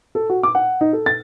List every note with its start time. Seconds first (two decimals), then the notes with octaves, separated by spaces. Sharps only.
0.15 A4
0.30 F#4
0.43 D6
0.55 F#5
0.81 D#4
0.93 A4
1.06 A6